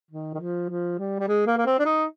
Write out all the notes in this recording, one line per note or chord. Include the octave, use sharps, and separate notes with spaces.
D#3
D#3
F3
F3
G3
G3
G#3
A#3
A#3
C4
D4
D#4